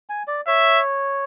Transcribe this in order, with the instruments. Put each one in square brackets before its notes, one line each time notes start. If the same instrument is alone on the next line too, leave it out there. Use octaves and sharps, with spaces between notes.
[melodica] G#5
D5
[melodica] C#5 [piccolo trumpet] E5